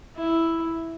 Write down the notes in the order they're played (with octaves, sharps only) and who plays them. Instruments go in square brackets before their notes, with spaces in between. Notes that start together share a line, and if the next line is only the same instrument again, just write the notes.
[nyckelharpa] E4